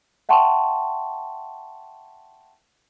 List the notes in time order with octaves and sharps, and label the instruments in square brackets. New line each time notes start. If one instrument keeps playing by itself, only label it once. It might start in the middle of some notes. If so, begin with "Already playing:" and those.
[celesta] E5 F#5 G5 A5 C6 C#6